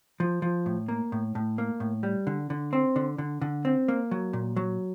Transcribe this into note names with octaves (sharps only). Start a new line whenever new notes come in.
F3
F3
A2
A#3
A2
A2
A#3
A2
G3
D3
D3
C4
D3
D3
D3
C4
A#3
F#3
A#2
F#3